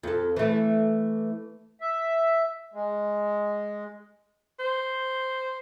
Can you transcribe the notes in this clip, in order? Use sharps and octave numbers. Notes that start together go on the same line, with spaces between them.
F2 A4
E3 A3
E5
G#3
C5